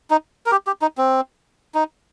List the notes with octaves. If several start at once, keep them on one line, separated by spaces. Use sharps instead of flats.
D#4
A#4
G4
G4
D#4
C4
D#4